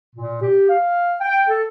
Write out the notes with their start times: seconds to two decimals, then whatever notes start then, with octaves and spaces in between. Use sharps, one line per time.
0.16 A#2
0.41 G4
0.69 F5
1.20 G5
1.47 A4